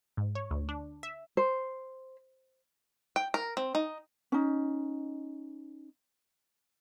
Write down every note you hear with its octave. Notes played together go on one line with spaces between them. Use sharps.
G#2
C#5
D2
D4
E5
C5
G5
A#4
C4
D#4
C#4 D#4